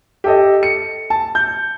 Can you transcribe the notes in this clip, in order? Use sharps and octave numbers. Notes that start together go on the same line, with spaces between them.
G4 A4 D#5
C#7
A5
G6